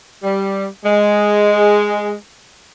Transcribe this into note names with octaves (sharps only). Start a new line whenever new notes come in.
G3
G#3